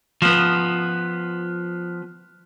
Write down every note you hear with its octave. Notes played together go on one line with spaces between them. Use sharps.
F3 B3